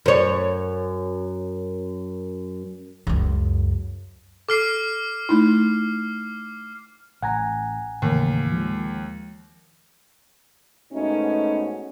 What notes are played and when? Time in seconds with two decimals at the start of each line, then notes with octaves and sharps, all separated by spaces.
0.06 F#2 C#5
3.07 C#2 F#2
4.49 A4 D6 F6 C7
5.29 A3 D#4 E4
7.23 A1 F#5 G#5 A#5
8.02 D#2 A2 C#3 E3
8.52 F3 G#3
10.93 G#2 A3 B3 C#4 D#4 F#4